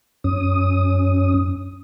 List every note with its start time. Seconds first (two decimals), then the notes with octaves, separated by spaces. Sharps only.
0.24 F#2 C#4 D#6